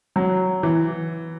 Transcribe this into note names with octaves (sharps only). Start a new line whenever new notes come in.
F#3
E3